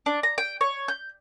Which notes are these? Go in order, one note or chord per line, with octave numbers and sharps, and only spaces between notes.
D4
A#5
G5
C#5
G6